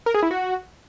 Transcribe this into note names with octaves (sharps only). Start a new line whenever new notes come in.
A#4
G#4
E4
F#4